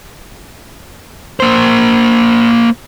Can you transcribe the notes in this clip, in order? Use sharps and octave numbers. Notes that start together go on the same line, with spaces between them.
A#3 C5